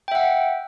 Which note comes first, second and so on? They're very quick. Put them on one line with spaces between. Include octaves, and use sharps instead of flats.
G5 E5 F#5